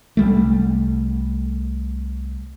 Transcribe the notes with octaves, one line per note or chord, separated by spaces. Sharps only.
C2 G3 A3